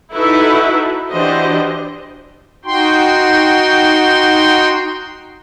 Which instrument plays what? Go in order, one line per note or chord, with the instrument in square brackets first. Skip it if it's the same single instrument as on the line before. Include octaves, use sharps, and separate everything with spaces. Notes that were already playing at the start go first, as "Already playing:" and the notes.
[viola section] D#4 E4 F#4 A4 B4 E5
E3 D4 F#4 G4 C5 D#5
[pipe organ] D#4 F#4 G5 C6